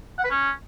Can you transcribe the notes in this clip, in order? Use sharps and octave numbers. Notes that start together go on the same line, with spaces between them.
F#5
B4
C#4